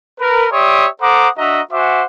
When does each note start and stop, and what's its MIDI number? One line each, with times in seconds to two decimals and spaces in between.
0.20 0.46 70
0.20 0.46 71
0.51 0.87 67
0.51 0.87 73
0.51 0.87 74
0.51 0.87 76
0.51 0.87 84
0.51 0.87 87
1.01 1.27 69
1.01 1.27 72
1.01 1.27 78
1.01 1.27 82
1.01 1.27 86
1.01 1.27 87
1.37 1.61 62
1.37 1.61 66
1.37 1.61 75
1.37 1.61 76
1.37 1.61 82
1.72 2.03 66
1.72 2.03 72
1.72 2.03 76
1.72 2.03 78
1.72 2.03 80
1.72 2.03 86